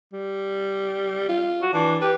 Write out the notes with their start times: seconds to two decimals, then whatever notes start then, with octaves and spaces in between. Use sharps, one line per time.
0.13 G3
1.29 F4
1.62 F#4
1.74 E3 D4
2.02 G4 B4